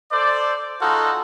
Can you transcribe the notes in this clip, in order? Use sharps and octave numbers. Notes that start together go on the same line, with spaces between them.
A4 C5 D5
G#3 D#4 F4 F#4 A4